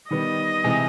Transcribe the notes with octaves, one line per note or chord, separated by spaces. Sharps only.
D#3 G3 B3 D#5
C3 E3 G#3